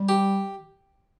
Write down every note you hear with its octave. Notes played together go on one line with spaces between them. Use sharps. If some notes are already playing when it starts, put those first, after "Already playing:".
Already playing: G3
G4